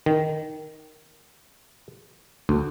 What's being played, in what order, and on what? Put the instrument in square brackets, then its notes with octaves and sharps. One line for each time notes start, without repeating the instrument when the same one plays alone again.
[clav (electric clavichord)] D#3
D2